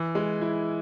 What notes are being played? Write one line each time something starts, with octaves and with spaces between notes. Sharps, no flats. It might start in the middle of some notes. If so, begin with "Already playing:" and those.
Already playing: E3
G#3
E4